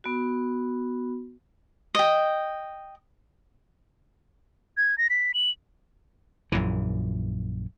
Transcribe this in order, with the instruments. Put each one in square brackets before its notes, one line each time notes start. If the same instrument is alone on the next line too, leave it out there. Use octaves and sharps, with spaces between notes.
[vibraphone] B3 F#4
[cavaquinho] D#5 G5
[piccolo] G#6
A#6
B6
F#7
[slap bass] A#1 F#2 A#2 E3